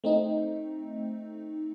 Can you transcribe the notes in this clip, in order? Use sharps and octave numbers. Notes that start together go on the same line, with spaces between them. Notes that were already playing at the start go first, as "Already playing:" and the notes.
A3 C4 D#4